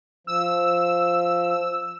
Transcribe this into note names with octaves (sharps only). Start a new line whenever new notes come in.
F3 E6